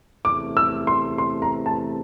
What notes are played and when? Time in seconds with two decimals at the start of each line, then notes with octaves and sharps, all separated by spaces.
0.25 E2 C3 E3 A3 D6
0.57 E6
0.87 C6
1.18 C6
1.42 A#5
1.66 A5